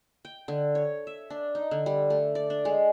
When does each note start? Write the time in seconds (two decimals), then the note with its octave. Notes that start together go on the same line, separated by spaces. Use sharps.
0.25 G5
0.48 D3
0.75 C#5
1.07 E5
1.30 D4
1.55 D#4
1.71 D3
1.86 G3
2.10 A3
2.35 D5
2.50 D4
2.65 G#3